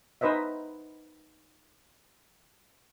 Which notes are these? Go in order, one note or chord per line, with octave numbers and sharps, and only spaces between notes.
D#4 B4 C5 D#5 E5